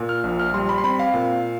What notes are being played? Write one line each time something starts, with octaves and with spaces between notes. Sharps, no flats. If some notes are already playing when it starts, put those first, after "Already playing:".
Already playing: A#2
F6
A#1
F6
G3 C6
B5
C6
C4 B5
F5
A#2